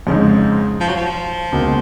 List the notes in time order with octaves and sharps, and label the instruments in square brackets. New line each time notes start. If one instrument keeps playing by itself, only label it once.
[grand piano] F2 C#3 G#3 D#4 [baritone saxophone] G#2
[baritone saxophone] F3
F#3
F3
[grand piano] C#2 B2 A#3